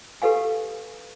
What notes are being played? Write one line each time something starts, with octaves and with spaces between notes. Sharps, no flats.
G4 A4 B4 F5 G#5